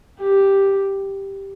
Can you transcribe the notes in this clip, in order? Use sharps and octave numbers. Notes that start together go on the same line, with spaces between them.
G4